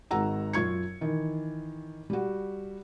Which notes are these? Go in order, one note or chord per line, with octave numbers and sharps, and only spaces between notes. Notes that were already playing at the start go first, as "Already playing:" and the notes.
G#1 G#3 F#4 F#5 A#5 E6
F#2 F4 C#6 G#6 C#7
D#3 E3
G3 F#4